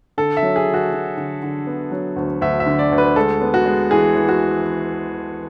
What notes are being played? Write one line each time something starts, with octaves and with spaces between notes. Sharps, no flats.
D3 A4
E5
F#3
G#4
D3
F#4
F#3
D3
D3
B3
F#3
D2
D2 E5
E5
D3
D5
D2
B4
G#3 A4
B3
F#4
G#3
E3 G#4
E3
F#4